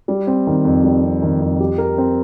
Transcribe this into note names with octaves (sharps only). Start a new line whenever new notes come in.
G3
C4
D#3
F2
G3
C4
D#3
F2
G4
A#4
C4